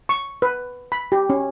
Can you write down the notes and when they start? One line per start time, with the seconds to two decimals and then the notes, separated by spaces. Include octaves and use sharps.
0.09 C#6
0.42 B4
0.92 B5
1.12 G4
1.30 C#4